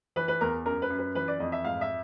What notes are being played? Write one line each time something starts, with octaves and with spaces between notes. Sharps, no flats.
E3 B4
B4
E2 A#4
F#2 A#4
B4
F#2
B4
E3 B4
D5
F2 D#5
E5
G#2 F5
E5